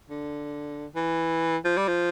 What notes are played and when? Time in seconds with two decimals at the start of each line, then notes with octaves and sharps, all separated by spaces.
0.10 D3
0.95 E3
1.65 F3
1.77 G3
1.88 F3